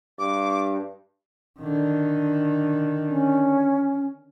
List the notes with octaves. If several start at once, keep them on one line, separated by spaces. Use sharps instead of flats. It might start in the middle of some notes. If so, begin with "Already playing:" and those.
G2 D6
D3 D#3
C#4